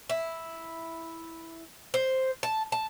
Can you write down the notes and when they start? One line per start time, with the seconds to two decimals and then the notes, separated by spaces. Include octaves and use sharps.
0.10 E4
1.94 C5
2.43 A5
2.72 A5